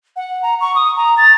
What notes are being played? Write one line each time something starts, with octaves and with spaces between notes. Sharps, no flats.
F#5
A#5
C#6
D#6
A#5
A6